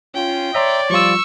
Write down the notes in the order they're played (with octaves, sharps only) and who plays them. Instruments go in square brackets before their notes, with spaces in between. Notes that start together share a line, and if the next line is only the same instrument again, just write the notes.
[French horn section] C#4 F4 [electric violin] G5
[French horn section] C#5 [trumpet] D5 [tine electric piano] E5 A#5 C6
[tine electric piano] F3 G3 F4 [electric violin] C#6 E6